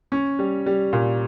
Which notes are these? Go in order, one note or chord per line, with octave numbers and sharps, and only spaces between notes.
C#4
G3
G3
A#2